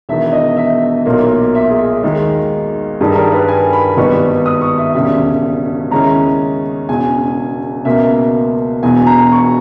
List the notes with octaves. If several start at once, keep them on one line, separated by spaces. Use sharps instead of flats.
E1 E2 D#3 E5
D#5
E5
B1 A#2 A#3
E5
G#4
D#2 D#3 G#3
G2 D#3 G3 G#4
A#4
B4
G#5
B5
G#1 G#2 G3 B3 D#4 C#6
D#6
C#6
E5
E1 D#2 C#3 G3 E5
D#2 C#3 G#3 C#4 E4 A#5
E1 E2 C#3 G#5
C#2 B2 A#3 E5
E1 E2 B2 G#5
A#5
C#6